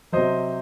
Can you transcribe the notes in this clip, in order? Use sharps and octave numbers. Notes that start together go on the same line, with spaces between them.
C3 F#3 C5 D#5